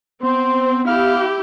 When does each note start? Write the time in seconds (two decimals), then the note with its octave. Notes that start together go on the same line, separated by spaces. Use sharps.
0.23 B3 C4 C5
0.87 E4 G4 F5